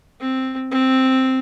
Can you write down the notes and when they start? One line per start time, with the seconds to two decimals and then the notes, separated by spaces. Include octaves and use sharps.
0.20 C4
0.71 C4